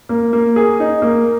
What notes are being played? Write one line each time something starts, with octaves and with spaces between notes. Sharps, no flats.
A#3
A#3
G#4
D#4
A#3